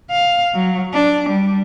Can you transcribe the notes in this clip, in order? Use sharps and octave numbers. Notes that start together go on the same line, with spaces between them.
F5
F#3
D4
G3